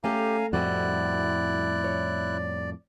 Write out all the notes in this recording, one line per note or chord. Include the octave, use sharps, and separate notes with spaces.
A3 C#4 G4 A4 F5 G#5 A#5
F2 A2 G3 C4 E4 F#4 D5 F#6
C#5